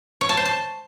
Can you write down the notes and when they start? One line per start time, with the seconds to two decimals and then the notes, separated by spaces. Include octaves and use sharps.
0.21 C#5
0.29 A5
0.37 C5
0.45 A5